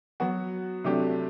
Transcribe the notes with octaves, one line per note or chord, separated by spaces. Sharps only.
F#3 B3 F#4
C3 F#3 A3 D4 G4